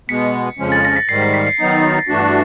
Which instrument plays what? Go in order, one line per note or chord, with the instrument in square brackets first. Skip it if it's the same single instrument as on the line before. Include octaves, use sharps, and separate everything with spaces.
[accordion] B2 G#3 B3 [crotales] B6 C#7
[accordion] F2 C#3 F3 G#3 C#4
[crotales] A6
A#6
B6
[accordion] G#2 D#3 G3 [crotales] C7
[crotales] B6
B6
C7
[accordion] D#3 F#3 B3 D#4
G2 E3 A3 D4 F#4